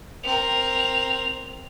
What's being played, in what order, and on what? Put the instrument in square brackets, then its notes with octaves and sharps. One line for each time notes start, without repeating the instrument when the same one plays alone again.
[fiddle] C4 A#4 [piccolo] F7